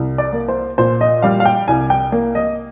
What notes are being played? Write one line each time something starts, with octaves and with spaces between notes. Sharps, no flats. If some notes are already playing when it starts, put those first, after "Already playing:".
Already playing: C2
D5
A#3
C5
A#2 C5
D#5
G3 F5
F5
G5
C2 G#5
G5
A#3
D#5